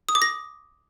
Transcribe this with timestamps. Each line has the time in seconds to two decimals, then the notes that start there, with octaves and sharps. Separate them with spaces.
0.09 D#6
0.15 D6
0.22 A#6